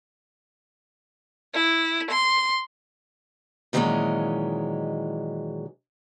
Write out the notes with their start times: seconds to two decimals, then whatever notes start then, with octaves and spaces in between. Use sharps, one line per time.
1.54 E4
2.11 C6
3.73 A#2 D#3 E3 F#3 G#3 C#4